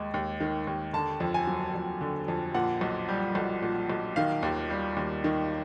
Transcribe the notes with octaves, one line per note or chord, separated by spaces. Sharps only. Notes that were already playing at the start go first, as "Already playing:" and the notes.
Already playing: D#2 G#3
D#2
D#3
D#2
D3 A5
F2
G#5
F#3
F2
D3
F2
A#2 F#5
B1
G3
B1
A#2
B1
D#3 F5
D#2
G3
D#2
D#3